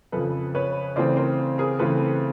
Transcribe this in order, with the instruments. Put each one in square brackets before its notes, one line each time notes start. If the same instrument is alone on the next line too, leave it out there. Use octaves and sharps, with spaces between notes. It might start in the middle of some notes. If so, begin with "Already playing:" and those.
[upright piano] F2 C#3 F3 A4 B4
B4 C#5
C#3 E3 A3 C4 C5 D5
A#4 C5
G#4 A#4
C#3 E3 A3 C4 A4 B4